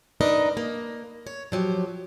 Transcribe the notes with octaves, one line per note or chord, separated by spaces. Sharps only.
D4 D#4 A#4 B4 D#5
A#3
C#5
F3 F#3 G4